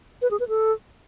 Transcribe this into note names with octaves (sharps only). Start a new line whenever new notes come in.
B4
G#4
B4
A4